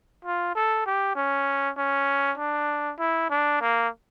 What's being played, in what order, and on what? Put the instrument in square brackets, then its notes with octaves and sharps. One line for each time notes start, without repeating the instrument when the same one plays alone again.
[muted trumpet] F4
A4
G4
C#4
C#4
D4
E4
D4
A#3